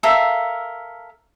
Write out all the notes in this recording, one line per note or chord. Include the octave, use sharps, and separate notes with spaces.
A4 A#4 E5 F5